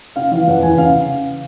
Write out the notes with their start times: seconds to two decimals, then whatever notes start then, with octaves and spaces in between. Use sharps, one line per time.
0.16 C#3 F5
0.31 E3 F5
0.47 E2 F#5
0.63 E2 G#5
0.78 C#3 F5